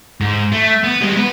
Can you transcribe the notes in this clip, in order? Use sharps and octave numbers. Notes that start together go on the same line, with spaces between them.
G#2
A3
B3
G3 G#3
B3 B4